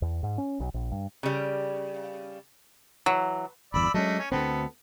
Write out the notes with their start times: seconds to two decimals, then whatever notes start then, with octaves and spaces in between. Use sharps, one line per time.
0.02 E2
0.23 G#2
0.38 C#4
0.60 B1
0.74 A#1
0.92 G2
1.23 C#3 G3
3.06 E3 F#3
3.74 G1 E2 D5 B5 E6
3.94 F#3 G#3 A3 C#4 D4 D#5
4.19 C#4
4.32 D2 D3 B3 C4 A4